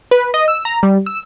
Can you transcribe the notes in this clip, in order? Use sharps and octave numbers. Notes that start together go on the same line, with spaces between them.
B4
D#5
E6
A#5
G3
E6